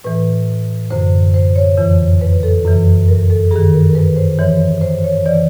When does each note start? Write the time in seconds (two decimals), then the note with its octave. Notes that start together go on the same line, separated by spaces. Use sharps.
0.04 A2 E3 B4
0.90 F#2 D3 C5
1.34 C5
1.56 C#5
1.77 F2 C#3 E3
2.21 B4
2.43 A4
2.65 F#2 C#3 E3
3.08 A#4
3.30 A4
3.51 G2 D#3 G#4
3.73 A#4
3.90 A#4
3.95 B4
4.16 C5
4.38 G#2 E3 C#5
4.81 C5
5.04 C#5
5.26 C#3 E3 D5